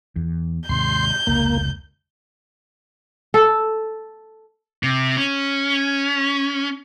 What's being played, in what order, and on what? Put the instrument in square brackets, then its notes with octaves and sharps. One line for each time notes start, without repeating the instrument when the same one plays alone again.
[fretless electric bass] E2
[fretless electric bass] D#2 G#2 C3 [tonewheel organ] C6 [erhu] G6
[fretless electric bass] F1 C#2 [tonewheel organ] A#3
[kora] A4
[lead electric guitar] C3
C#4